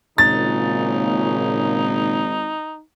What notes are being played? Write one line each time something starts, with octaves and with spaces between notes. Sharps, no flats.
G#1 A#2 C#3 D#4 A6